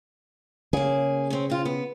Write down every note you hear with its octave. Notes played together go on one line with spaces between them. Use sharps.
C#3 A#3 G#4
C4 C#4
C4 F4
B3